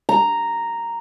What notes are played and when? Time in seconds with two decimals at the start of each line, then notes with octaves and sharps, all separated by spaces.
0.09 A#5